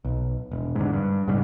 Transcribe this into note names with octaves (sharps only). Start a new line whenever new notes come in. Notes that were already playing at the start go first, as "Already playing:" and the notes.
B1
E1
G#2 D3
G2
G#2 C#3 G3